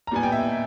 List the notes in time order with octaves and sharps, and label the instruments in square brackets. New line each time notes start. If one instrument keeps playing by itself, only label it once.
[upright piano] A#5
A#2 G3 B3 G#5
G5
E5